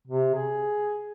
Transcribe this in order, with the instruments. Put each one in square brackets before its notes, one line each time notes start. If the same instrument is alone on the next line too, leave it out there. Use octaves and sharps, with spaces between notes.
[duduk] C3
G#4